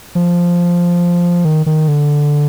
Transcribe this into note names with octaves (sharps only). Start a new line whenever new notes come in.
F3
D#3
D#3
D3